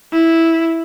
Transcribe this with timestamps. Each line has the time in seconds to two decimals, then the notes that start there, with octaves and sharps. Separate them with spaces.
0.13 E4